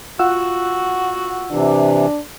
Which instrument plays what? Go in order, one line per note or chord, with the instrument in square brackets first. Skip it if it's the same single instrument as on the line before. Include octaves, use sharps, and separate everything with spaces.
[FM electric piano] F4 F#5 E6 [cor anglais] F#4
[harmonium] C3 E3 [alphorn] D4